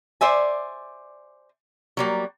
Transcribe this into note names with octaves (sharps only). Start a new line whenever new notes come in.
C5 D5 E5 G#5
F#3 G3 A#3